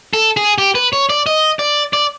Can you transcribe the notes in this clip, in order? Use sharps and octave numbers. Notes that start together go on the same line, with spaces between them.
A4
G#4
G4
B4
C#5
D5
D#5
D5
D5